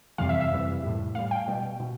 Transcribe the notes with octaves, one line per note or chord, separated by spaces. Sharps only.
F2 C3 E3 G3 F5
E5
E5
F2 C3 E3 G3
A2 G3
A2 G3 F5
G5
B2 G3
B2